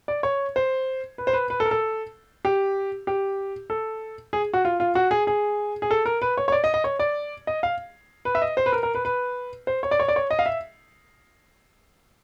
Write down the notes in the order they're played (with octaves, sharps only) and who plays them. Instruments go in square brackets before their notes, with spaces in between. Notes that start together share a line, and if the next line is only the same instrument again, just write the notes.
[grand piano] D5
C#5
C5
B4
C5
B4
B4
A4
A#4
A4
G4
G4
A4
G#4
F#4
F4
F4
F#4
G#4
G#4
G#4
A4
A#4
B4
C#5
C#5
D5
D#5
D#5
C#5
D5
D#5
F5
B4
E5
D#5
C5
B4
A#4
A#4
B4
B4
C5
C#5
D5
C#5
D5
C#5
D#5
F5
E5